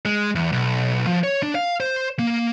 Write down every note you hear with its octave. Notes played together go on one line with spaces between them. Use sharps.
G#3
E2
B1
F3
C#5
D4
F5
C5
A#3